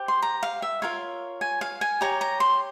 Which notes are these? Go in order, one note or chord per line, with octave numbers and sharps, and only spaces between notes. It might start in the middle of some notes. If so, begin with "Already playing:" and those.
Already playing: G4 C5
C6
A#5
F5
E5
F4 A#4 C#5 F5
G#5
F5
G#5
G4 C#5 A#5
A#5
C6